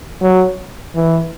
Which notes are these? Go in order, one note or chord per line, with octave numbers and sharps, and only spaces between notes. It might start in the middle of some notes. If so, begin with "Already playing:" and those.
F#3
E3